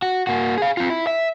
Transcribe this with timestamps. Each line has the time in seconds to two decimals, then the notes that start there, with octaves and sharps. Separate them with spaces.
0.02 F#4
0.27 A#3 F#4
0.58 G#4 F5
0.77 C4 F4
0.90 E4
1.07 E5